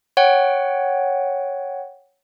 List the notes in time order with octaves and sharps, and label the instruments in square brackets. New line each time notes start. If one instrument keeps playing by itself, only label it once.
[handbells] C#5 F#5 G5